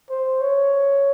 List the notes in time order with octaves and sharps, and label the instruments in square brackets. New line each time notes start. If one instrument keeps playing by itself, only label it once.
[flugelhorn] C5
C#5